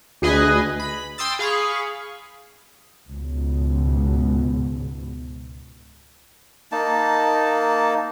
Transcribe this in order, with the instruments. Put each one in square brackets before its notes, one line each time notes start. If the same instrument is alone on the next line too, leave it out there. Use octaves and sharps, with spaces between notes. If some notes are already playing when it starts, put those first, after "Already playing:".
[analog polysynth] D2 G#4 B4 D#5 G#5
B5
G5 C6 D#6 E6 A6
G#4 F5 B5 C#6
[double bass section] C#2 G#2 B2
[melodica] A#3 D#4 A5